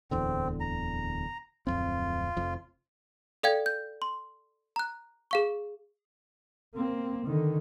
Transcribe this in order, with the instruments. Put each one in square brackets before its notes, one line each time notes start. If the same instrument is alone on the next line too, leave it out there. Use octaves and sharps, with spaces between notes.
[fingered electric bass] D1 E2 D3 [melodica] C4
[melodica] A#5
[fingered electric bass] D1 F2 C4 [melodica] F4
[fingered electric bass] F1 F2 F3
[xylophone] A4 D5 F5 G5 G#6
G6
C6
A#5 F#6
G#4 F5 C#6
[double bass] A#3 C4
D3 D#3